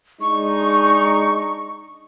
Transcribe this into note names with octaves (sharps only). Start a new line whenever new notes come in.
G#3 D4 D#4 C#6